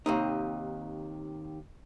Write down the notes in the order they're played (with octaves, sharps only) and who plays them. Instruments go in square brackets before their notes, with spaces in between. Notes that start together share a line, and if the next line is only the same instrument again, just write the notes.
[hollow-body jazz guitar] D#2 C3 D#4